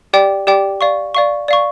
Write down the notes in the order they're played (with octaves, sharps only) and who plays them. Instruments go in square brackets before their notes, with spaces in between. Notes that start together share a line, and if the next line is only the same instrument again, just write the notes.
[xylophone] G4 D5 G5 D6
G4 D5 G5 D6
D5 F5 C#6
D5 F5 C#6
D5 F5 C#6